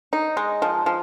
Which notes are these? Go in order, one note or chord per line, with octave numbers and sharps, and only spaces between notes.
D#4
G#3
F3
F3